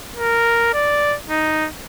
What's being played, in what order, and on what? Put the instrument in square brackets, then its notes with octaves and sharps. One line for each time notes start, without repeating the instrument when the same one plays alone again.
[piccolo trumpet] A#4
D5
D#4